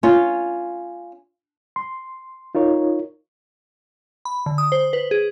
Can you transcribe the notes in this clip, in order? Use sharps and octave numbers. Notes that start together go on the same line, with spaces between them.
C#4 F4
C6
D#4 F4 A#4 C#5
B5
D3
D#6
C5
B4
G#4